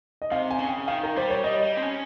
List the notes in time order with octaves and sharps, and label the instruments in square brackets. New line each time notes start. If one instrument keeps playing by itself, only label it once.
[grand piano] D#5
[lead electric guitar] C3 [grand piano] F5
[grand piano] G#5
[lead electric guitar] C#3
[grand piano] G5
[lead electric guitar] D#3 [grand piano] F5
[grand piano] A#4
[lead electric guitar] G3 [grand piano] C5
[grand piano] C#5
[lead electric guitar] G3 [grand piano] D#5
[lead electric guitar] G3
C4
C#4